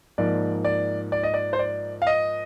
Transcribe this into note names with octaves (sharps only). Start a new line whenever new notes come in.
G#2 F3 A#3 D5
D5
D5
D#5
D5
C5
D5
F5
D#5